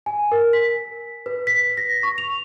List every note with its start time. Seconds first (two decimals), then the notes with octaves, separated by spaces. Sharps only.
0.06 G#5
0.32 A#4
0.53 B6
1.26 B4
1.47 B6
1.77 A#6
2.03 C#6
2.18 F7